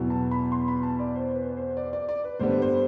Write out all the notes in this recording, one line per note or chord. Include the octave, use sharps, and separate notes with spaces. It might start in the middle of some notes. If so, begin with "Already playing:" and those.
Already playing: E2 B2 F#3 B3 E4
A5
B5
C6
B5
A5
D5
C5
B4
C5
D5
D5
D5
B4
G2 D3 G3 B3 D4 C5
B4
C5